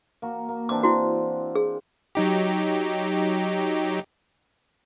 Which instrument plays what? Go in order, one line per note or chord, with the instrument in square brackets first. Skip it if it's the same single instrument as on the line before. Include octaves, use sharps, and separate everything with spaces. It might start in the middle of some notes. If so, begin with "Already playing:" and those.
[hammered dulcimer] A#3 F#4
A#3
[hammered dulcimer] E3 C4 D4 [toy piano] D6
[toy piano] E4 F#4
G#4
[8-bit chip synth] F#3 D#4 G4